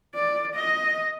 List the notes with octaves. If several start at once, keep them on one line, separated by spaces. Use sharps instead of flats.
D5
D#5